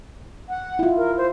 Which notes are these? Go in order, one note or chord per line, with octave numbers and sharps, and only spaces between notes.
F#5
E4 F4
A#4
C5